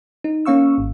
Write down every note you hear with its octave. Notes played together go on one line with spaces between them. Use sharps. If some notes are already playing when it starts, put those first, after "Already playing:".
D#4
A#3 C#4 F5 C#6 E6
G#1